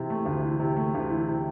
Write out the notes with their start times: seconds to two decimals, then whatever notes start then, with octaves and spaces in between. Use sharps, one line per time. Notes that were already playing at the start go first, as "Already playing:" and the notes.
Already playing: C3 E3
0.10 A3
0.26 D2
0.43 E3
0.60 C3
0.76 A3
0.94 D2
1.10 E3
1.28 C3